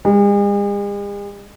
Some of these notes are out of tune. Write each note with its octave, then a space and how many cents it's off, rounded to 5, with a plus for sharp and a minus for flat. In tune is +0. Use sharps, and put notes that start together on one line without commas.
G#3 -45